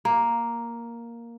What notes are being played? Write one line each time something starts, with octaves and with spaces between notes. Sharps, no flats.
A#3